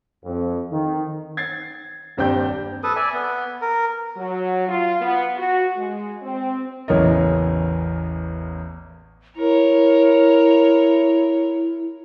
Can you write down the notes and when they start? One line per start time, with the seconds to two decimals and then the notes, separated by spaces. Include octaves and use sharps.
0.25 F2
0.71 D#3
1.37 G#6 A6 C7
2.17 D#1 G2 C4 D5 G5 G6
2.84 A4 B4 D#6
2.96 D5 E5 G#5
3.13 B3
3.61 A#4
4.17 F#3
4.69 F4
5.00 B3
5.37 F#4
5.76 G#3
6.22 C4
6.88 A1 E2 C#3 A#4 C#5 D#5
9.37 E4 A#4 C#5